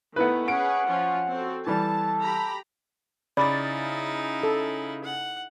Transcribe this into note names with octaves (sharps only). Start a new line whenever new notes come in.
D#3 A3 B3 E4 B4
C#4 G#4 B4 F#5 D7
F3 C#4 F4
C4 F#4 A4
E3 G3 A4 A5
G4 A#5 B5
C#3 D#4 E4 D5 B5 A6
A4
F#5